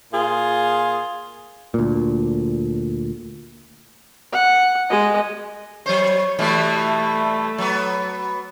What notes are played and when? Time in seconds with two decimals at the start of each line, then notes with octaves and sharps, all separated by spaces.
0.12 A#2 F4 G#4
1.74 D2 A#2
4.32 F#5
4.90 G#3 D#5
5.86 F#3 C5 C#5
6.39 B2 E3 G3 A3
7.58 F#3 B3